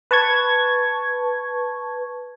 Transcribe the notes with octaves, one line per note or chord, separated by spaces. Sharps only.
B4 A5 C#6 G#6